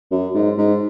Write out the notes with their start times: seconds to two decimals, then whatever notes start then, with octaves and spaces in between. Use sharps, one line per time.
0.11 F#2
0.34 G#2
0.58 G#2